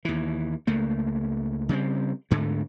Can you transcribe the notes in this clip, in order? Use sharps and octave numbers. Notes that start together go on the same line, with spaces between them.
D#2 E3
C#2 A3 A#3
C#3 G3 A3 C4
D2 G#2 D3 A3